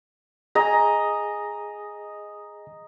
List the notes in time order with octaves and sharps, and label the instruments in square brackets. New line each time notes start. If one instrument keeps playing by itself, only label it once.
[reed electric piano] G#4 G#5 [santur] D#5 A#5